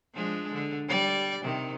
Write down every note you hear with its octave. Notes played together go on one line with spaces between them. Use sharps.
F3 G#3 D4
D3
G3 D5
C3 D#3